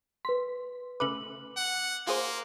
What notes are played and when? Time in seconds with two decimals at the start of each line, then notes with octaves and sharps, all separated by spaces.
0.25 B4 C6 B6
1.00 C#3 A3 B4 D6 F#7
1.57 F#5
2.07 A#3 F4 G#4 C5